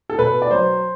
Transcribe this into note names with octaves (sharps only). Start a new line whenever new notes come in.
A4
B2 B4
D5
F#3 C5